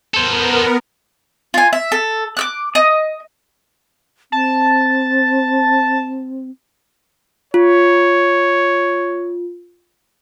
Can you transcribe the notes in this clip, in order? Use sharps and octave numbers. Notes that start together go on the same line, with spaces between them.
B3 A4 A#4 C5
F4 G#5
E5
A4
D6 E6 F#6
D#5
C4 A5
F4 C#5